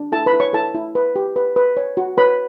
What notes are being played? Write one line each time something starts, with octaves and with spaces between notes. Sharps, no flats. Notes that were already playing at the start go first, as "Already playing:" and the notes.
Already playing: D4
E4 A4 A5
B4 B5
E4
C#5 C#6
E4 A4 A5
E4
B4
G4
B4
B4
C#5
F#4
B4 C#5 B5